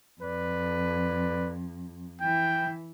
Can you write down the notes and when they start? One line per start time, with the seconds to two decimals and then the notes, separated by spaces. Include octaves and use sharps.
0.21 F2 B4 D5
2.21 E3 E5 G5